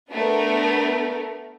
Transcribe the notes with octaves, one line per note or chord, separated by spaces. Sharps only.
A3 B3 D4 A#4